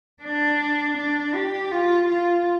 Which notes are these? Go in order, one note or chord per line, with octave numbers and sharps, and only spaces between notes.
D4
D4
G4
F4
F4